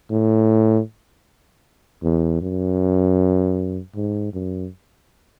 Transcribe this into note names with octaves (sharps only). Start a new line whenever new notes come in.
A2
E2
F#2
G#2
F#2